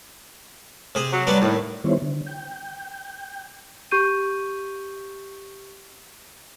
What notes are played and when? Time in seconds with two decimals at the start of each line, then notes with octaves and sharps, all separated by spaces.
0.95 C3 G#4
1.12 F#3
1.27 G3 B3 D4
1.42 D#2 A2
1.84 D#3 G3 B3 E4 C5 C#5
2.02 D3
2.27 G5
3.91 G4 C#6 G6 D#7